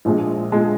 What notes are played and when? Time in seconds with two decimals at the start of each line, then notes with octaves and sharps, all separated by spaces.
0.05 A#1 A#2 G#3
0.52 A#2 G#3